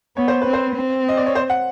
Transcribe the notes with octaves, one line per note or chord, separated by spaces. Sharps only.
B3 C#5
C5
C4 B4
C5
C4
D#5
D5
C#5
C5
F#5